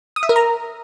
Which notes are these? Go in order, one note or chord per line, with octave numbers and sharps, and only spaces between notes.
D#6
E5
A#4
A#5